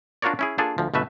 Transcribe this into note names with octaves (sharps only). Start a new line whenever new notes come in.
D4 F4 F#4 A#4 C#5 D5
C#4 E4 G#4
A#3 D4 F4 G#4 A4
D2 F3
G1 B2 A3 B4 E5